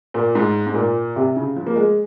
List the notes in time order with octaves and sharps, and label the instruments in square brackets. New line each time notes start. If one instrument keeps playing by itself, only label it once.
[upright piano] A#2
G#2
G#2
A#2
C3
C#3
F3
A#3
G#3